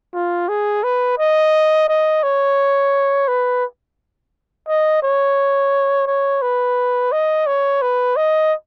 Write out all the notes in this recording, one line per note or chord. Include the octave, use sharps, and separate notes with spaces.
F4
G#4
B4
D#5
D#5
C#5
B4
D#5
C#5
C#5
B4
D#5
C#5
B4
D#5